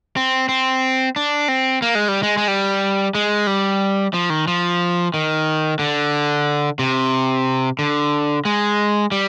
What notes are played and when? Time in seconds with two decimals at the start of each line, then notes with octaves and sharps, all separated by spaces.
0.17 C4
0.49 C4
1.16 D4
1.48 C4
1.82 A#3
1.95 G#3
2.08 G3
2.23 G#3
2.37 G#3
2.48 G3
3.15 G#3
3.47 G3
4.14 F3
4.30 D#3
4.48 F3
5.14 D#3
5.79 D3
6.79 C3
7.79 D3
8.45 G#3
9.12 G3